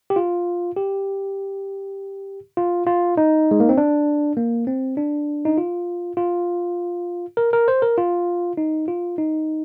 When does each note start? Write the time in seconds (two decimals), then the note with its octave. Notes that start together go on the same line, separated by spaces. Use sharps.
0.10 G4
0.16 F4
0.77 G4
2.57 F4
2.87 F4
3.17 D#4
3.51 G#3
3.60 A#3
3.69 C4
3.78 D4
4.37 A#3
4.67 C4
4.97 D4
5.45 D#4
5.58 F4
6.17 F4
7.37 A#4
7.53 A#4
7.68 C5
7.82 A#4
7.98 F4
8.57 D#4
8.88 F4
9.18 D#4